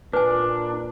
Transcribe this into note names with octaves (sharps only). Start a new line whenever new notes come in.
A#2 D4 B4 G#5